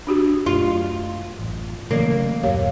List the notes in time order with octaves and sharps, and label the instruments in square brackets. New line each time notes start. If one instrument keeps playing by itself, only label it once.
[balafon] D4 F#4 G4
[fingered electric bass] F#2 A3 [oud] F4
[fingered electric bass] A1
[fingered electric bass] C#3 A3 [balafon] E3 F#3 [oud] A#3
[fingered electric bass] D#1 F#2 [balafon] G4 C#5 F5